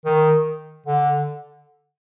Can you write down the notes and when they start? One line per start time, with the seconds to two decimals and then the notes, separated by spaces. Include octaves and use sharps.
0.05 D#3
0.86 D3